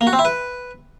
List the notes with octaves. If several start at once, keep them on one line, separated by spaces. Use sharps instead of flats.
A#3
F#4
C4
E4
B4